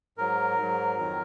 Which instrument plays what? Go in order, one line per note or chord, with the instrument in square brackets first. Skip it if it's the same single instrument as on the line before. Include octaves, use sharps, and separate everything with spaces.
[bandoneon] G#2 F#3 A#4
G#2 F#3
F2 D#3 F#3